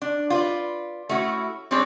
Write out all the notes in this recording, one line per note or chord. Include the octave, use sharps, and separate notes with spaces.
D4
F4 B4 D5
A3 C#4 E4 F#4
G3 C4 D4 G#4 C#5 D5